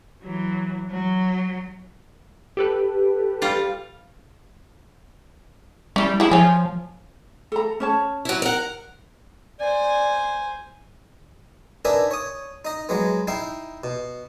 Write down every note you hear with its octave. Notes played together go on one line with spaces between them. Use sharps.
E3 F#3
F#3
G4 A4 B4
G3 F4
G3 C#4 E4
F3 G#3 E4
F3 C#5 G#5
A4 A#5
C#4 C#5 A5
F#3 E4
A#4 F#5
C5 D5 G#5
D4 D#4 A#4 B4 E5 G#5
C#5 D#6
D#4 D#5
F#3 G#3 B3
D#4 E4 F5 G5
B2